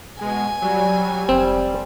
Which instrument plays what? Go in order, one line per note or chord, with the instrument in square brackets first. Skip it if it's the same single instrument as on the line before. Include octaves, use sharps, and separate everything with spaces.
[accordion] B2 [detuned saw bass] G#3 [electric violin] G#5
[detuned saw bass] F#3 [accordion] G3
[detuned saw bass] F1 [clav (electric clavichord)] C4